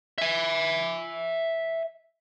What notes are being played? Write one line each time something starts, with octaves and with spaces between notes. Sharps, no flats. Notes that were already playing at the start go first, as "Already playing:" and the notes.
E5 G#5